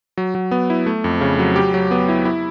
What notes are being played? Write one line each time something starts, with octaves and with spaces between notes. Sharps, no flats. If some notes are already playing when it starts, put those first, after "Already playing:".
F#3
F#3
B3
E4
A3
F2
C#3
F#3
G4
F#3
B3
E4
E4